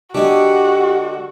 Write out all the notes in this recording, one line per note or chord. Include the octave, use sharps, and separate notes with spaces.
D3 G#3 F#4 G4